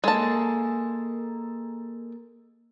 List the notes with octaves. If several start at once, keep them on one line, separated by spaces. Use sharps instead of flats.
G#3 A#3 G#4 A4 A5